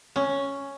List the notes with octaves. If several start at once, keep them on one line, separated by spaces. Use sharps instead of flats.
C#4